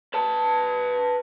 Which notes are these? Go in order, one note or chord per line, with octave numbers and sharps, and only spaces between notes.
B4 A5